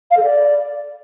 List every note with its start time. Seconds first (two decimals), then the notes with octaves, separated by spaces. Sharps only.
0.11 F5
0.17 A4
0.23 D5